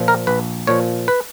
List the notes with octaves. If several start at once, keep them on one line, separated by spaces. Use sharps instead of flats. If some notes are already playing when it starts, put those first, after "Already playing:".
Already playing: A#2 F3
A#4
A#1 B4
A#2 F3 C#5
B4